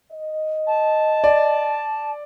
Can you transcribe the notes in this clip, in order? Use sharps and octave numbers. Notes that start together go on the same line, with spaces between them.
D#5
A5
D5